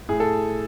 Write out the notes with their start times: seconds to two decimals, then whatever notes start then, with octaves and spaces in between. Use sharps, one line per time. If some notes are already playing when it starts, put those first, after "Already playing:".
0.09 A2 G#4
0.20 A4